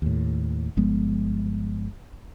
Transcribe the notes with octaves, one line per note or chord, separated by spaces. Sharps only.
D#2 A2
G1 F3 G#3 B3